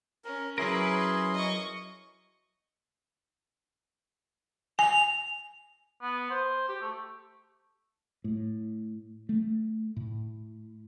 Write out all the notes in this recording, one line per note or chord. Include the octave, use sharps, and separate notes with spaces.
C#4 A#4
F#3 C#4 E4 G#4 A#4 B4 C6
D#5 C#6
G#5 F7
B3
C5
G4
A3
A2
A3
A2